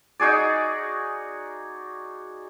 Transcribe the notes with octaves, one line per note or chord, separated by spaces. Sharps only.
D#4 F#4 G#4 D5